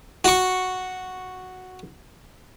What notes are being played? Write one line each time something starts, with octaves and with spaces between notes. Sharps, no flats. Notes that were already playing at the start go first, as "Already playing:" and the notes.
F#4 C#6